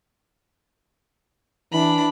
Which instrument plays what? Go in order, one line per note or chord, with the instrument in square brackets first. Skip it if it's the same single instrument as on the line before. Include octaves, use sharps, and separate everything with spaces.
[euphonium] E3 [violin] D4 B5